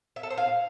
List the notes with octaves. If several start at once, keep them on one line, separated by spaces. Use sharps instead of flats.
E5
A4
C5
F5